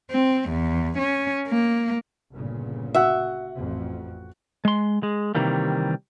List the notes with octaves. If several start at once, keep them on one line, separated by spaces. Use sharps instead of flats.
C4
E2
C#4
A#3
G1 A#2 C#3
F#4 E5 F#5
A1 F2
G#3 C6
G#3
C3 D#3 E3 G3 A#3